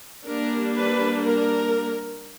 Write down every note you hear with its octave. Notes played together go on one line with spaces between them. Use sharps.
G3 A#3 D4 A#4
B4
A#4